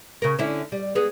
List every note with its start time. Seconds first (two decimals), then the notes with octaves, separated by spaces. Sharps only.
0.22 C#3 A#4
0.39 D3 C#4 E4
0.72 G3
0.95 G#3 B3